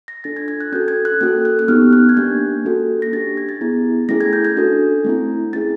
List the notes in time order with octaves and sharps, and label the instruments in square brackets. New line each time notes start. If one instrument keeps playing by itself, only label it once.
[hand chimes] A#6
D4 F4 A4 A6
G#6
G#6
F#6
C#4 F#4 A4 G6
G#6
F#6
A#3 C#4 F#4 A4 F#6
F#6
F#6
B3 D#4 G4 F6
F#6
G#6
A#3 D4 G4 G6
A#3 C#4 F#4 A4
A#6
D4 G4 A6
G#6
A6
B3 E4 G#4
A3 C#4 E4 G#4 A#6
G#6
G6
G6
D4 F#4 A4
A3 C4 E4
C#4 E4 G#4 A6